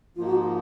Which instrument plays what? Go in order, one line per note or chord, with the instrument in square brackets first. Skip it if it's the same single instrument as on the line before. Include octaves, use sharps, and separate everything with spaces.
[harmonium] G#2 F3 A#3 D#4 [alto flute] F4
[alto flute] F#4
F4